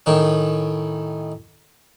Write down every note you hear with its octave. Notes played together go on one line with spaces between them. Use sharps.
A2 D#3 C#4